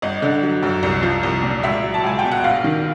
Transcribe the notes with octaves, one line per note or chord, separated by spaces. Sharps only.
G1 D#5
D3
F#3
F#2
C2
F3
C2
A#2
C#2 E5
F#3
A5
C#2 G#5
G5
B2
F#5
A#1 F5
D#3